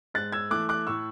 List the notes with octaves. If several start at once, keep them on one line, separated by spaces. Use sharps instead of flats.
G#2 F#6 A6
E6 G#6
E3 A3 D6 F#6
D6 F#6
A2 C#6 E6